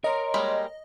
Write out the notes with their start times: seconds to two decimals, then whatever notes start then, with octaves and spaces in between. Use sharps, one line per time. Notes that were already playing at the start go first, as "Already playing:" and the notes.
0.04 A#4 C#5 D#5 A#5 C6
0.34 G3 G#3 A#3